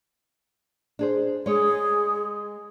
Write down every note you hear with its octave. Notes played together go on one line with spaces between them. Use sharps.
D4 G#4 C5
G#3 G#4 C#5